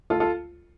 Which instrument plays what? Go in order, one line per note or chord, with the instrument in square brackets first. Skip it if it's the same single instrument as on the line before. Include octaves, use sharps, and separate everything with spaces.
[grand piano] D2 F4 A4
F4 A4